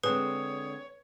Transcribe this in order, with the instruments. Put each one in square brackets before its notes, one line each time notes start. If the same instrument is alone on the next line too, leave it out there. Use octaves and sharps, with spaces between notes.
[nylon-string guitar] D3 G#3 C4 [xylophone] B4 [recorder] C#5 [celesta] D#6